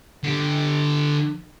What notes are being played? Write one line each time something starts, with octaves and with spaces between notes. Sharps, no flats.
D3 G4